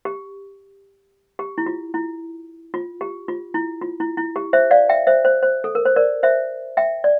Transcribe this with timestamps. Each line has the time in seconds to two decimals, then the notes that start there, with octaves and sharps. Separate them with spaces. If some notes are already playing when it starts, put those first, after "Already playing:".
0.05 G4
1.39 G4
1.58 E4
1.66 F4
1.94 E4
2.74 F4
3.01 G4
3.28 F4
3.54 E4
3.81 F4
4.00 E4
4.17 E4
4.36 G4
4.53 C5 E5
4.71 D5 F5
4.89 E5 G5
5.07 C5 E5
5.25 C5
5.43 C5
5.64 A4
5.75 A#4
5.85 C5
5.96 A#4 D5
6.23 C5 E5
6.77 E5 G5
7.04 D5